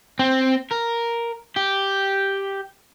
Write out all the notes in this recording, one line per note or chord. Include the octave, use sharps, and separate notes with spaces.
C4
A#4
G4